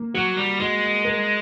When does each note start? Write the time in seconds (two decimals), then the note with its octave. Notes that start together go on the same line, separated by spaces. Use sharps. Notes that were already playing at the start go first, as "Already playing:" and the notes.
Already playing: A#3
0.14 F#3 F#4
0.37 G3
0.60 G#3 F#4
1.05 A#4